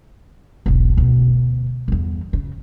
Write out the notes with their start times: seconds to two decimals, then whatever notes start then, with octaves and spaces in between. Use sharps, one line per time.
0.66 E1 B1
0.97 D2 B2
1.88 G1 E2
2.33 C#3